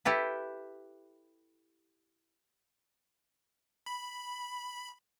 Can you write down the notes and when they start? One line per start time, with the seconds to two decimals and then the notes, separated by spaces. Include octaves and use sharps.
0.05 E4 G4 A4 B4
3.86 B5